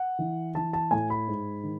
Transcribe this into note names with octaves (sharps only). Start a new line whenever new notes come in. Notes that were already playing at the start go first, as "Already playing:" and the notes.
Already playing: F#5
E3
E3 A5
A5
A2 G#5
B5
G#2
D#3